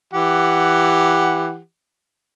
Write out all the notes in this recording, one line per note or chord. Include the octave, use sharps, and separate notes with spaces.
E3 G4 F#5